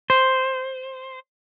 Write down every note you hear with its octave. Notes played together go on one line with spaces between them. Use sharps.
C5